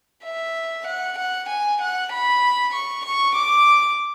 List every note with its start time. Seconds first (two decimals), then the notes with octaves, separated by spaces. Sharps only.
0.25 E5
0.87 F#5
1.18 F#5
1.49 G#5
1.81 F#5
2.12 B5
2.73 C#6
3.05 C#6
3.36 D6